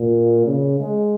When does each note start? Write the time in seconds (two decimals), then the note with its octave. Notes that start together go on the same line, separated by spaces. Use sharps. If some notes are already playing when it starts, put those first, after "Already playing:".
Already playing: A#2
0.46 C#3
0.80 G#3